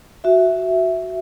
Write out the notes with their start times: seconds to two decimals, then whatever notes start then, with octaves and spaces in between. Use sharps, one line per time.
0.24 F#4 E5